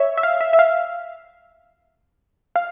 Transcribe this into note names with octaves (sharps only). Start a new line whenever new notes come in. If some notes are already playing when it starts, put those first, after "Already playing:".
Already playing: C#5 E5
E5
F5
E5
E5
F5
F5